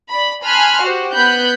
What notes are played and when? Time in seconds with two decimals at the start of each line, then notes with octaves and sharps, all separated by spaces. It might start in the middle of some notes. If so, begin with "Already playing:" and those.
0.12 D5 B5
0.43 G#5 A5 B5 C6 F6 F#6
0.83 F#4 G4 C5
1.13 B3 B5 F#6 G6